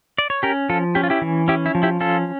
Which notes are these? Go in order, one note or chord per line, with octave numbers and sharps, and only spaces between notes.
D5
C#5
C#4 G4 A#4
F3 F4 A4
C#4 G4
F4
E4 G4
E3
C#4 E4 G4
E4
F3
E4 G4
C#4 F4 A4